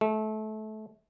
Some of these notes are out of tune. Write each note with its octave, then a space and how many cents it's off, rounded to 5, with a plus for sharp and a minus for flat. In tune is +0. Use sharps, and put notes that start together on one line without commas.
A3 -25